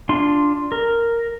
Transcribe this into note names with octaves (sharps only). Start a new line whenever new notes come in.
D4 F4 C6
A#4